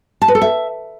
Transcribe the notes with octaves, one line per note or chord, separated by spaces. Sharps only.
A5
B4
A4
E5